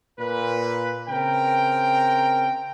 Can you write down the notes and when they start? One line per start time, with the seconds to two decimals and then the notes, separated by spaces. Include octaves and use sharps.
0.19 A#2 B4
1.09 C#3 C4 A#4 G5